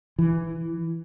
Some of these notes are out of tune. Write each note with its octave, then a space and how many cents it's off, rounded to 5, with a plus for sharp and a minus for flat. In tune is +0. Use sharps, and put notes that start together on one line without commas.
E3 +5